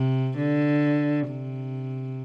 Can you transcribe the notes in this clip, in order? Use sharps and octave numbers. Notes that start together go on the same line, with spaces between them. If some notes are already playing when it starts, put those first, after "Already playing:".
Already playing: C3
D3
C3